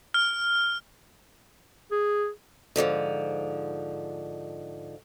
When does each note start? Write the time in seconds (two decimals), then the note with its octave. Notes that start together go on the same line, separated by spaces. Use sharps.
0.14 F6
1.91 G#4
2.76 G#2 D3 E3 F3